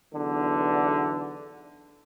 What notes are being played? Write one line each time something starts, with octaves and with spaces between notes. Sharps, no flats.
B1 E2 D3